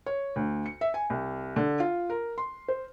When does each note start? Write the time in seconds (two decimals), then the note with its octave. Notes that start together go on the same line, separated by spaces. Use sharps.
0.06 C#5
0.36 D2
0.66 C#7
0.81 E5
0.94 G#5
1.10 C2
1.56 D3
1.80 F4
2.10 A#4
2.38 C6
2.68 C5